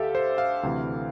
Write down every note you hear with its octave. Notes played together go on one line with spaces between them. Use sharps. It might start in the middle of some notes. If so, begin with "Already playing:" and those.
Already playing: D2 D3 G4 A4 E5 F5
C5
F5
D2 C3 E3